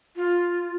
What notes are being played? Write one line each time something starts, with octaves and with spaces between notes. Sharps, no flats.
F4